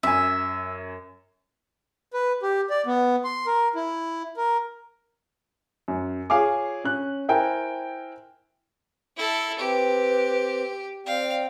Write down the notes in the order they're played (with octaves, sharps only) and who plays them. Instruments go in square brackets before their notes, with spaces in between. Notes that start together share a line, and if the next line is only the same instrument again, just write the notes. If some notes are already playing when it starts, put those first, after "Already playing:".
[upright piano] F#2 G#5 [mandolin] E5
[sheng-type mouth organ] B4
G4
D5
B3
C6
A#4
E4
A#4
[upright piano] F#2
F4 G#4 C#5 F5 G#5 D6
C#4 F#6
E4 A#4 C5 G5 G#5
[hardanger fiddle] E4 A4
[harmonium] C4 [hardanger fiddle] G4 [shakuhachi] B4
[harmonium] C4 G5 [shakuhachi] D5 [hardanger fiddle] F5